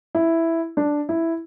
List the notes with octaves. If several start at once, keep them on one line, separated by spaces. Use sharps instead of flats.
E4
D4
E4